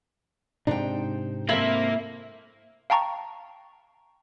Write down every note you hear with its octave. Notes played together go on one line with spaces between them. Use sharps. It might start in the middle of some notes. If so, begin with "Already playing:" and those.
G#2 C3 D4 D#4 C5 G5
A#3 C4 E4 A4
F5 G5 A5 A#5 C#6